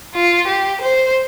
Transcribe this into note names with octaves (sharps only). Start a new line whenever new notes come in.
F4
G4
C5